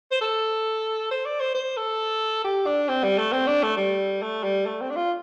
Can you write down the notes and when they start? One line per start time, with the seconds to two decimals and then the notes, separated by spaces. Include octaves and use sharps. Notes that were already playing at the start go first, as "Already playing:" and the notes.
0.11 C5
0.21 A4
1.11 C5
1.25 D5
1.40 C5
1.54 C5
1.77 A4
2.44 G4
2.66 D4
2.88 C4
3.04 G3
3.18 A3
3.32 C4
3.47 D4
3.63 A3
3.77 G3
4.22 A3
4.44 G3
4.66 A3
4.81 C4
4.90 D4
4.96 F4